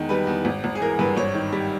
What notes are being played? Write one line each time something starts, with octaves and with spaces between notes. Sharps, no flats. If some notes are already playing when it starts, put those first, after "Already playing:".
Already playing: E2 D#3 G#3
G3 B4
E2
G#1
G#1
G#4
E3 A#4
G2 B4
G#1 C#5
D#3
G3